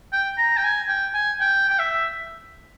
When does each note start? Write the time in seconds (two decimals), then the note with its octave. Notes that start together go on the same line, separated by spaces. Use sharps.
0.13 G5
0.38 A#5
0.57 G5
0.64 G#5
0.89 G5
1.14 G#5
1.40 G5
1.69 G5
1.79 E5